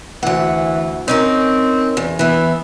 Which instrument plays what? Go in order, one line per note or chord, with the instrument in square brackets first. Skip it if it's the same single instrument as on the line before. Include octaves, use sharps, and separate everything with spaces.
[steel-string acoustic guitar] D2 F#5 [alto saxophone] E3
[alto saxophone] C4 [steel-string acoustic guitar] C#4 D#4 A#4
[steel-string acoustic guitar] E2
[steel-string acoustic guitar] E3 B3 [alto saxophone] E4